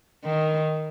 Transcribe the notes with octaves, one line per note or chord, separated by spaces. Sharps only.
D#3